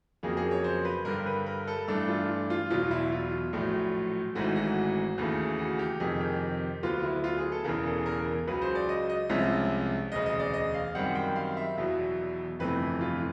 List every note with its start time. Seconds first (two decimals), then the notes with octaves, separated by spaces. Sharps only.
0.23 F2 C#3 F#3 A#3 G#4
0.37 G#4
0.51 C#5
0.64 C5
0.85 B4
1.05 G2 D3 G3 A#4
1.26 B4
1.46 A#4
1.67 A4
1.88 G2 E3 A3 D4 A4
2.08 F4
2.50 F4
2.70 E1 E2 B2 F#3 F4
2.91 E4
3.12 F4
3.53 A#1 A2 F#3 A3
4.35 G#1 G#2 E3 A3 F#4
4.56 F#4
5.18 D#2 C#3 E3 A3
5.59 F#4
5.79 G4
6.00 F2 C3 D#3 G#4
6.21 G4
6.82 D2 D3 F#3 B3 F4
7.03 E4
7.24 F4
7.38 G#4
7.52 A4
7.64 E1 E2 C#3 E3 A#4
7.85 A4
8.06 A#4
8.47 C#2 C#3 F#3 B4
8.62 C5
8.75 D5
8.89 D#5
9.09 D#5
9.29 C2 C3 F3 G#3 C#4 E5
10.12 E1 D2 C#3 D#5
10.26 D#5
10.39 D5
10.54 D#5
10.74 F5
10.95 F#2 D#3 G3 C4 F#5
11.15 G5
11.36 F5
11.57 E5
11.77 E1 E2 B2 F#3
12.59 G1 F2 C3 E3 A3 B4
13.01 F4